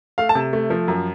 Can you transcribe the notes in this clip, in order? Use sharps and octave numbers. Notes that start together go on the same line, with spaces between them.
A3 F5
A5
C3
A3
F3
F#2